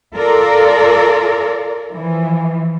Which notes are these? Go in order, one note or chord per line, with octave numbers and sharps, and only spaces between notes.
F4 A4 A#4 D5
E3 F3